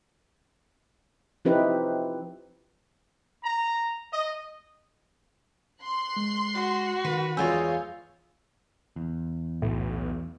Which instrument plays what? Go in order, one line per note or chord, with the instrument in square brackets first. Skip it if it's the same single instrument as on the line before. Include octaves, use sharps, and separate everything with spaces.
[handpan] F3 C4 D#4 E4 G4 B4
[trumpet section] A#5
D#5
[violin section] C6 F#6 C7
[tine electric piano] G#3
[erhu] F#4
[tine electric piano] D#3 [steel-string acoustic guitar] B4
[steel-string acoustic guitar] E2 G#3 F4 [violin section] C#5 F5 [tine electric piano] G#5 E6 G6
[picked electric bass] E2
[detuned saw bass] B1 [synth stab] A2